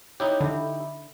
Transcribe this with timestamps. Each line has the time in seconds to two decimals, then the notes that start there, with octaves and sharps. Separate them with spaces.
0.20 D#4 E4 G4 C#5
0.41 D3 E5 B5